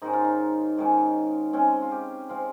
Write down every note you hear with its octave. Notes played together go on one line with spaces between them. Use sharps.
G#2 D#3 G#3 C#4 D#4
F4
D#4
G#2 D#3 G#3 C#4
C#3 G#3 C4 C#4
F4
G4
C#3 G#3 C4 F4